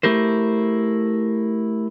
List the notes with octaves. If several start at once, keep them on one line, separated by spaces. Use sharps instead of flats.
A3 E4 G4 A#4 C5